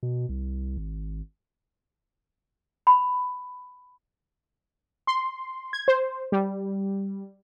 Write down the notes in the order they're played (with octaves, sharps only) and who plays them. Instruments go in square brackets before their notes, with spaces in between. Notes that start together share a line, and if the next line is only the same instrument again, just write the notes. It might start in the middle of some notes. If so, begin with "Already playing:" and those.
[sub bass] B2
C2
G#1
[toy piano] B5
[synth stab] C6
G#6
C5
G3